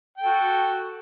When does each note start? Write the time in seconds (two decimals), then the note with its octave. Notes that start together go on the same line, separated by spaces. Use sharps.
0.18 G5
0.22 A4
0.26 F#4